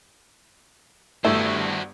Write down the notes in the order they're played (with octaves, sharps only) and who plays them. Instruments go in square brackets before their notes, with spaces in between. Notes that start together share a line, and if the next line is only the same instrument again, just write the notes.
[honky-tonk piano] G1 G2 [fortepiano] A3 [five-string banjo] E4 [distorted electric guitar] F#4 C5